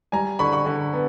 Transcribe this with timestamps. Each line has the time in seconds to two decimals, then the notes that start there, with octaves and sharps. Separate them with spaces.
0.12 G3 G#5 A#5
0.39 D3 B5 C#6
0.53 B5 C#6
0.66 D3
0.93 B3